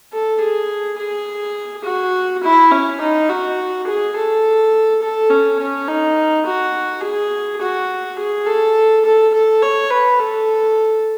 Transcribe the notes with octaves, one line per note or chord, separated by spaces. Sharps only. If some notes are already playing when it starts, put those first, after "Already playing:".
A4
G#4
G#4
F#4
E4
C#4
D#4
F#4
G#4
A4
A4
C#4
C#4
D#4
F#4
G#4
F#4
G#4
A4
A4
A4
C#5
B4
A4